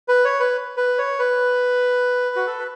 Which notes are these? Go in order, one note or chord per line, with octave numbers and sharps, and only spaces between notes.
B4
C#5
B4
B4
C#5
B4
F#4
A4
B4